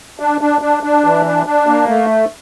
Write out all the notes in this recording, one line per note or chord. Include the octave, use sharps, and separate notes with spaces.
D4
D4
D4
D4
E3
D4
D4
A#3
A3